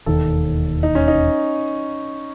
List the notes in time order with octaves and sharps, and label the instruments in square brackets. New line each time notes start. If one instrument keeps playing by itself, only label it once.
[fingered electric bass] E1 D#2 D#3 [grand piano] A4
[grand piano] D#4
C#4
D#4